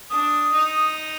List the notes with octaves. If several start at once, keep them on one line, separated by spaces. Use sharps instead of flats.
D4 D#6
D#4